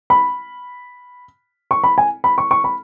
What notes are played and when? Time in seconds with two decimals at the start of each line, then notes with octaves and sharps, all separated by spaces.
0.10 B5
1.71 C#6
1.84 B5
1.98 G#5
2.24 B5
2.38 C#6
2.51 C#6
2.64 B5